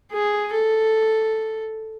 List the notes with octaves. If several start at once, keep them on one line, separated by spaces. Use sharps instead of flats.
G#4
A4